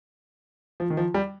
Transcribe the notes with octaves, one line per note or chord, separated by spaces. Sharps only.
F3
D#3
F3
G3